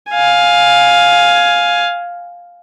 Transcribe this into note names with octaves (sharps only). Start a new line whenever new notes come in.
F5 G#5